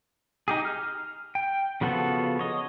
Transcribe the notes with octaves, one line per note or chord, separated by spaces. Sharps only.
D#4 G4 G#4
F6
G5
C#3 F3 B3 F#4 A4
C#5 D#5